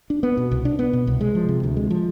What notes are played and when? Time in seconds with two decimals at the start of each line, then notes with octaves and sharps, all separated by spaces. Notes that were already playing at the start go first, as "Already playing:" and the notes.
0.10 D4
0.23 B3
0.37 B2
0.51 C2
0.65 D4
0.79 B3
0.93 B2
1.07 C2
1.21 G#3
1.35 F3
1.49 C3
1.63 D2
1.77 G#3
1.91 F3